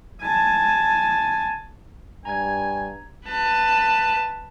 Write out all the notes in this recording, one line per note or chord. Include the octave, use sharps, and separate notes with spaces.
G#5 A5
G2 G#5 A#5 G#6
B4 A5